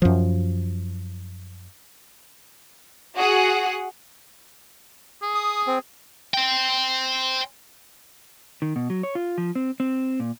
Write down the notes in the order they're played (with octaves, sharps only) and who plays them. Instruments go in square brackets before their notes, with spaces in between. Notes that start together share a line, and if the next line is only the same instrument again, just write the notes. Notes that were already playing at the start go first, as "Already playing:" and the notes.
[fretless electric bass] F#2 F3
[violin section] F#4 G#4 F#5
[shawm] G#4
[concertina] D#6
C4
[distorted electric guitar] C5 G5
[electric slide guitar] D#3
B2
F#3
C#5
F4
F3
C4
C4
A#2